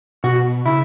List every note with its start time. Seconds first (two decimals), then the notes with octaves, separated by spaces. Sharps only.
0.24 B2 F#4
0.66 C#3 E4